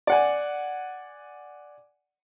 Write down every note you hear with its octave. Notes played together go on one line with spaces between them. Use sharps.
D5 F#5 G#5